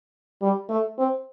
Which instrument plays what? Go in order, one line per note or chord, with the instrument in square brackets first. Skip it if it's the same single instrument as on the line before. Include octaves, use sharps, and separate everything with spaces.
[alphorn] G3
A3
C4